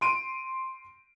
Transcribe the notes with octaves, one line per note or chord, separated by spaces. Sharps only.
C6 D7 D#7